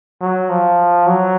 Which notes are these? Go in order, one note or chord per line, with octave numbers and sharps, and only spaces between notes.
F#3
F3
F#3